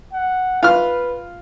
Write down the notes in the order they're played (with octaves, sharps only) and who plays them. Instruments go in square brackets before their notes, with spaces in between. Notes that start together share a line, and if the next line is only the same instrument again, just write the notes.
[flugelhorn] F#5
[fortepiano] F4 F6 [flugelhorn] B4